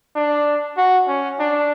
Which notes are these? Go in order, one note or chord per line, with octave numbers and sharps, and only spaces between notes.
D4
F#4
C#4
D4